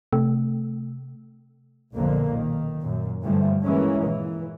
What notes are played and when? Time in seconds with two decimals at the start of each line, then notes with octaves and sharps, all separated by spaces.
0.13 C3 A3
1.94 B1 F2 A#2 D3 A#3
2.32 D#3
2.79 F#2 A#2
3.24 G2 D3 E3 F3 G3 A3
3.61 E3 G#3 A#3 C#4
4.02 A#2 E3